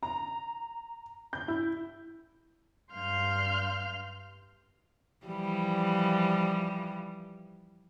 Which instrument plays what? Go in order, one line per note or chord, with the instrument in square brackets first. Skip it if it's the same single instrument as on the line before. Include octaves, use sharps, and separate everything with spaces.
[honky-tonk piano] A#5
G6
E4
[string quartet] G2 F5 C6 F6 G6
[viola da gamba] E3 F3 G3